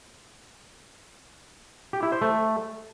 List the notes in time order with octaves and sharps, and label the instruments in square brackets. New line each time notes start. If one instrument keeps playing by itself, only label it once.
[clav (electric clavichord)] G4
E4
C5
A3